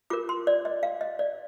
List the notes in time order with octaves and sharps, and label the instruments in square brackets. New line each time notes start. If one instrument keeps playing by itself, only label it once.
[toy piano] F4 A#4 D6
C6
D5
D#5
F5
D#5
D5